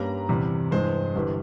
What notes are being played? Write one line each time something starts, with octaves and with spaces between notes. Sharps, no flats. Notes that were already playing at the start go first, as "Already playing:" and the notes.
Already playing: G2 G3 A#3 C#4 A#5
E2 C3 G3
G2 E3 G#3 C5
G1 G2 E3 G3